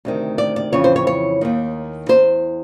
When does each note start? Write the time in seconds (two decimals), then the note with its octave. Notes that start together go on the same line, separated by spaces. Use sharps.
0.05 D2 C3 D#3
0.38 D5
0.56 D5
0.73 F2 C#3 E3 C#5
0.84 C5
0.96 C#5
1.07 C#5
1.41 D#2 D#3
2.09 E2 B2 C5